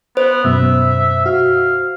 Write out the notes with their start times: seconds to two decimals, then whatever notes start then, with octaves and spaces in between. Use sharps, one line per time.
0.17 B3 C5
0.45 F#2 B2 E5
1.26 F#4 F5